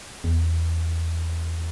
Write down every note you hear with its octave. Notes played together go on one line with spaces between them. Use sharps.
E2